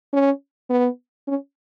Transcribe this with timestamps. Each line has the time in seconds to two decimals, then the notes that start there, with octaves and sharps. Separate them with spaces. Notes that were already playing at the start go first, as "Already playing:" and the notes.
0.13 C#4
0.70 B3
1.28 C#4